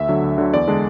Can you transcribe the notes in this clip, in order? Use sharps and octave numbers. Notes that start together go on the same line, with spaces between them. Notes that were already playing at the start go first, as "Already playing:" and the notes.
Already playing: D2 E5
D3 F#3
D2
D3 F#3
E2 D5
D3 G#3 D4